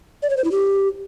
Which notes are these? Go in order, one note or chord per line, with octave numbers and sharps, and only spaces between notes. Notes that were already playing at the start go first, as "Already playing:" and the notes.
D5
C#5
C5
E4
G4